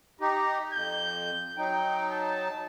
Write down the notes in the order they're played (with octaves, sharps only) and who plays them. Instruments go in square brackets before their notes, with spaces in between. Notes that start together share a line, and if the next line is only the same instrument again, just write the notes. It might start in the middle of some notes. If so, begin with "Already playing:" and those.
[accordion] D#4 G4 [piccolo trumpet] A#5
[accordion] F2 [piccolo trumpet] G6
[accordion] F#3 D#4 [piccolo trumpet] G5
[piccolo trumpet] A5